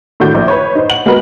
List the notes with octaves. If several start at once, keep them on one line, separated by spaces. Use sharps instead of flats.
A2 D#3 D4 F#4 G6
A#1
B4 C#5
D#4 C5
F#5 F#7
G#3 B3 F#4 A#4 B4